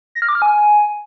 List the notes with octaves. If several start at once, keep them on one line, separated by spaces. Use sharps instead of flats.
A#6
F6
D6
F6
G#5